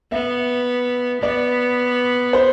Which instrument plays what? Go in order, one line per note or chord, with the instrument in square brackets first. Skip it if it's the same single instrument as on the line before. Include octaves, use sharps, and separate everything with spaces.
[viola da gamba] B3 [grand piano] E5
[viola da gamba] B3 [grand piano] D5
[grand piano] C5